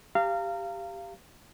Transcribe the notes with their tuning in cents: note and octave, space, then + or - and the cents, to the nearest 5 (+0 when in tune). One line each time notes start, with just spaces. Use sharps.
G4 +5 F5 -20 A#5 -30